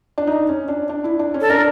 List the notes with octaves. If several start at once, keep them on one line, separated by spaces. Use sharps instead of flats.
D4
D#4
C#4
D4
D4
E4
D4
C#4
A4
D4 A#4